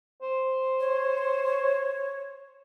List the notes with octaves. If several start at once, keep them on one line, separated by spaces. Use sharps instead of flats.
C5
C#5